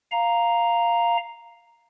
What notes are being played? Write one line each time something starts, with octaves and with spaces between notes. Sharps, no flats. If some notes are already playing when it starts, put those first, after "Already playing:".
F5 A#5